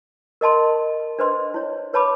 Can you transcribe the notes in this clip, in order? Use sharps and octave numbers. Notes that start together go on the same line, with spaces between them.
A#4 D#5 A5 C6
D4 B4 C5 D#5 C6
E4 C#5
B4 C#5 A5 B5 D6